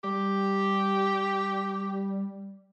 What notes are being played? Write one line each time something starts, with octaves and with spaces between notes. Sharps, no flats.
G3 G4